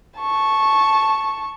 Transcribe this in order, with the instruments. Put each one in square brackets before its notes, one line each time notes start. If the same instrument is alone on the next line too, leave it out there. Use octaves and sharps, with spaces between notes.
[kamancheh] A5 C#6